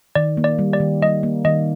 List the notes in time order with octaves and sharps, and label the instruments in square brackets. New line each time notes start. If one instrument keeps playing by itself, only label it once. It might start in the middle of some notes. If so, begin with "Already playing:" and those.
[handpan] D#3 [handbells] D5
[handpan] A#3
[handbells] D5
[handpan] G3
[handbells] D5
[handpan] D#3
[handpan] G3 [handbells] D#5
[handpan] A#3
[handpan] D#3 [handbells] D#5